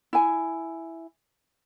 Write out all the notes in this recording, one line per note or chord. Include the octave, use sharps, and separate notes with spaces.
E4 G#5